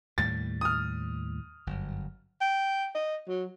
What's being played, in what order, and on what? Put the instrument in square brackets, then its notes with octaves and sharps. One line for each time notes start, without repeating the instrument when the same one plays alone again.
[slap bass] D#2 A2 G3 [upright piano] A6
[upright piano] D#6 F6
[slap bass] G1 F#2
[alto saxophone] G5
D#5
F#3